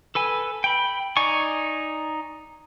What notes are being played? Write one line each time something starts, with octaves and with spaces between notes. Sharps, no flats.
A4 B4 G#5
G5 B5
D#4 D5 G#5 C#6